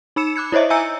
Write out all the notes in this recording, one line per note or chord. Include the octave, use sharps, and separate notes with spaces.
D#4 B5 E6 C#7 E7
D6 F#6 G#6 C#7
E4 C5 C#5 D#5 E5
E5 G#5 A#5 E6 G6 C#7